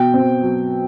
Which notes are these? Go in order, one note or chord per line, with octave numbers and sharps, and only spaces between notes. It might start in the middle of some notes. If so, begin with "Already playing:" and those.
Already playing: B2 G5
C4
F#3